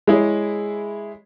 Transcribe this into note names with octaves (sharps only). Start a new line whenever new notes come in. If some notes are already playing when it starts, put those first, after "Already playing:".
G#3 E4 G#4 C#5